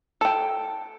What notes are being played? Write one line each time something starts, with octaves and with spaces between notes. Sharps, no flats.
A4 G5